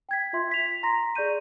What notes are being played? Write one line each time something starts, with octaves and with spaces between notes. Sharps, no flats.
G5 G#6 B6
F4 E5 C6
B6 F7
A#5 C6 A#6
G#4 D5 C#6 G6 D#7